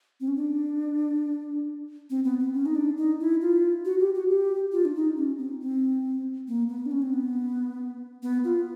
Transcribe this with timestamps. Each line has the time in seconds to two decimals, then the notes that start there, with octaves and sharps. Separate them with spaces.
0.20 C4
0.28 C#4
0.36 D4
2.10 C4
2.24 B3
2.39 C4
2.53 C#4
2.66 D#4
2.75 D4
2.97 D#4
3.20 E4
3.41 F4
3.85 F#4
4.00 G4
4.15 F#4
4.29 G4
4.72 F4
4.85 D4
4.95 D#4
5.17 C#4
5.38 C4
5.61 C4
6.48 A#3
6.69 B3
6.86 D4
6.91 C#4
7.02 C4
7.14 B3
8.23 B3
8.44 F4